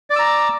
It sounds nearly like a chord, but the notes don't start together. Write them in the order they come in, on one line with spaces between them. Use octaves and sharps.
D5 D6 E6 A#5